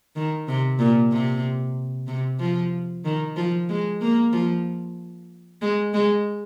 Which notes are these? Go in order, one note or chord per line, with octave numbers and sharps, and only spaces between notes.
D#3
C3
A#2
C3
C3
F3
D#3
F3
G#3
A#3
F3
G#3
G#3